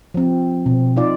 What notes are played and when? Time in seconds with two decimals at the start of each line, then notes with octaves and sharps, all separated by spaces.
0.14 F3 C4
0.66 B2 C4
0.96 D#4 F4 D5